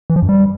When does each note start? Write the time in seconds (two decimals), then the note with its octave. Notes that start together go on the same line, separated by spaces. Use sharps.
0.10 E3
0.16 F3
0.22 F#2
0.29 G3